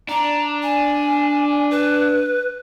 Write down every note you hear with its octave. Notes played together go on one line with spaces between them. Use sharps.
D4 A#5
G#5
B4